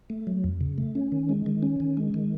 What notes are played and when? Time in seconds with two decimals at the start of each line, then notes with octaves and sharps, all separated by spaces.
0.10 A3
0.27 F#3
0.44 F2
0.61 C#3
0.78 A3
0.95 C#4
1.12 D#3
1.29 G#3
1.46 D#3
1.63 C#4
1.80 D#3
1.97 G#3
2.14 D#3